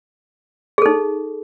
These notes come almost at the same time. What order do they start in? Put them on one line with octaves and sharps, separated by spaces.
G#4 A4 D#4